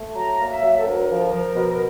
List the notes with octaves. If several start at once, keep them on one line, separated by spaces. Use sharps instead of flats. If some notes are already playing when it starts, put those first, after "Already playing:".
Already playing: A3
F#3 A#5
A#3 F5
E5
F#3
A4
D2 A#4
F3
F3
B2